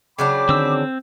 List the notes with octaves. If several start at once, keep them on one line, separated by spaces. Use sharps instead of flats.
C#3 F#3 D4 G5 B5 D6
D3 D#3 C4 E6